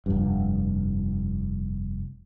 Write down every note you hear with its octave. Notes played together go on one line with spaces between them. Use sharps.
F1 G2